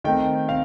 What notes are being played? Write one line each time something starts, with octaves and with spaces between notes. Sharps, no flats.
D#3 A3 C4 G5
C4 F5